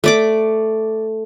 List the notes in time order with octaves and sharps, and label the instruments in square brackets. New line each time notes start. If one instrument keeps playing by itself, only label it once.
[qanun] A3 D5 D6